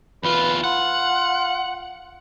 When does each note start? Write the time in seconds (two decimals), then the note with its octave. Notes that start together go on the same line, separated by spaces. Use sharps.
0.23 E2 F4 B4
0.64 F4 F#5